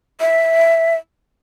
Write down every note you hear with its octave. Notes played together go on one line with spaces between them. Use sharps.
E5